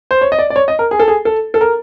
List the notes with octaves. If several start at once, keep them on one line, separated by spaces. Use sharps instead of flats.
C5
C#5
D#5
D5
D5
C#5
D#5
A#4
G#4
A4
G#4
A4
A4
A#4